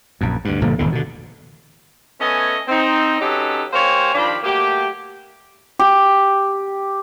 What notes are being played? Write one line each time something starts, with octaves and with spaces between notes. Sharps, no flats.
A#1 F#2
D2 G2
G1 A#2 D3 F3
D#1 G#1 E2 D3
B2 D3
A3 B3 C#4 D#5 G#5
C4 D#4
F#3 C#4 D#4 G4 A4 B4
A#3 G4 C5 C#5 F5 G#5
D#3 F3 D4 F4 G4 B5
F#3 A3 A#3 G4
G4